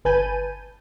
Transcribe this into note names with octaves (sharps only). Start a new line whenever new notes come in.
G1 B4 G#5 A5 G6 D#7